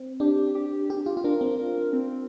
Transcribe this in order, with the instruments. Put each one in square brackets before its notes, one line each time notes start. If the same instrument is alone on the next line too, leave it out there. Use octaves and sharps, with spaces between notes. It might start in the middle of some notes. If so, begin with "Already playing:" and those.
Already playing: [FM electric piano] C4
[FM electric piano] D4 [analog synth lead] G4
[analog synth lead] G4
[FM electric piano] G4
F4
F4
[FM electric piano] D4 [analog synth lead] A#4
[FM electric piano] C4
[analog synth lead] A#4
C4